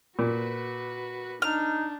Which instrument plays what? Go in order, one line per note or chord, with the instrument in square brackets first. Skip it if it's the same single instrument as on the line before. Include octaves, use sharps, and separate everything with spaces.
[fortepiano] A#2 [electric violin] F#4 B4
[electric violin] D4 [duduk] D#4 [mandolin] F6